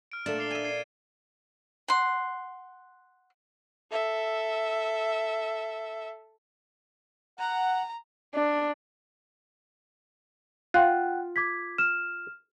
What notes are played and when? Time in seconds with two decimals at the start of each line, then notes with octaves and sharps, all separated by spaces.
0.12 F6 D7
0.26 A#2 A3 A#3 D4 A6 E7
0.39 D6 C7 G7
0.51 E5 G#5 D#7 G7
0.64 G#6 C7 D#7
1.88 F#5 C6
3.91 A4 E5
7.39 F#5 A#5
8.35 D4
10.74 F4 F#5 G5 F#6
11.36 D6 G#6 B6
11.78 F6 E7